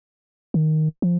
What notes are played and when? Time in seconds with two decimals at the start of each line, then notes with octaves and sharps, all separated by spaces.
0.54 D#3
1.02 F3